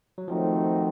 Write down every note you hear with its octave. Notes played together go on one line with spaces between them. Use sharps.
F#3
D#3 F3 A3 C4 D#4 F#4